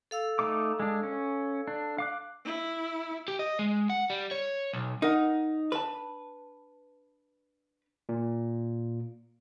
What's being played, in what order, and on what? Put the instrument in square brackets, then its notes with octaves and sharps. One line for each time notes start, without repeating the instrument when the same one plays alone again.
[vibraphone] A4 F5 E6
[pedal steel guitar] A3 D#4 D6
G#3 D4
C#4
D4
F5 D6 F#6
[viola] E4
[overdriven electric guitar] G4
D#5
G#3
F#5
G3
C#5
B1
[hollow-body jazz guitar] D#4 [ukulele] A#4 F#5
[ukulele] D4 A5 [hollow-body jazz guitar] B4
[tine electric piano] A#2